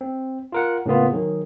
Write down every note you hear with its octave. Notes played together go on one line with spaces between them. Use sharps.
C4
F4 A#4 F#5
A2 C#3 A#3 B3 F4
D#3 F#3 G#4